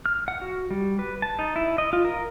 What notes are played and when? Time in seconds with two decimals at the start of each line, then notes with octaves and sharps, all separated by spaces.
0.06 F6
0.28 F#5
0.41 F#4
0.71 G3
0.99 B4
1.22 A5
1.39 D#4
1.56 E4
1.78 D#5
1.93 F4
2.05 A#4